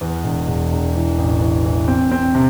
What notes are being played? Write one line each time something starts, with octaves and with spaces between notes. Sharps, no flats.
E2
E1
E1
E1
E3
A1
E3
E3
C4
C4
C3